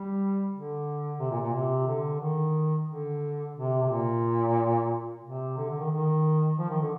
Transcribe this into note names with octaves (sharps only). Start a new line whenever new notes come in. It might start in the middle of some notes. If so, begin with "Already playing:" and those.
Already playing: G3
D3
C3
A#2
A#2
C3
D3
D#3
D3
C3
C3
A#2
C3
D3
D3
D#3
D#3
F3
D#3
D3